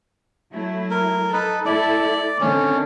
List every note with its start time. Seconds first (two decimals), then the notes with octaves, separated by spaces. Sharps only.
0.52 F#3 A3 E4
0.91 A#4
1.33 D#4 A4 B4
1.66 A3 E4 A4 D5
2.41 D3 D#3 C4 C#4